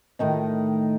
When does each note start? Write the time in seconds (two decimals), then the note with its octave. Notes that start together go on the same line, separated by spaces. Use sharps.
0.19 A2 D#3 D#4 D#5